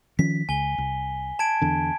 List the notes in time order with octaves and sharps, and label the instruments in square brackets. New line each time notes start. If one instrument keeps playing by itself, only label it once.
[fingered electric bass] D#3 F3 C#4 [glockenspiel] B6
[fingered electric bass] C#2 [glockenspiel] G#5 G7
[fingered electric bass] C2
[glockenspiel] A5 G#6 D7
[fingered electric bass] E2 D3